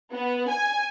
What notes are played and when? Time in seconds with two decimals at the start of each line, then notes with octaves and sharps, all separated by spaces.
0.12 B3
0.48 G#5